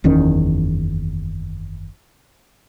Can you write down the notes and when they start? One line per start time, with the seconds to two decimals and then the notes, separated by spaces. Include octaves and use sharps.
0.04 F#1 E2 D#3 C#4